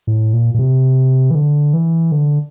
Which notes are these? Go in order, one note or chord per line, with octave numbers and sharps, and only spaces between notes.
A2
A#2
A#2
C3
E3
D3
E3
D3